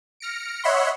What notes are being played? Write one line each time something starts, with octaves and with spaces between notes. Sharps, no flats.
F6 A#6 C#7 D7
C#5 D#5 E5 F#5 B5 C6